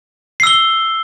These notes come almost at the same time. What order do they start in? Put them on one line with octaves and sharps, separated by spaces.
C7 E6 G7